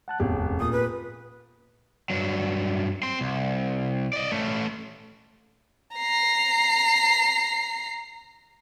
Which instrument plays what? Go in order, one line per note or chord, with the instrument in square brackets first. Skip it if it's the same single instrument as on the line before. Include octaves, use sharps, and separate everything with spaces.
[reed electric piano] F#5 A5 F#6
[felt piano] F1 G4 [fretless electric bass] D#2 G#2 B3 [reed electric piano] C#4 G#4
[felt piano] A#2 [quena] D#6
[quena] B4
[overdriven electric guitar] G2 F#3
C4 C6
C2
D5 D#5
A3 C#4
[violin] A#5 C7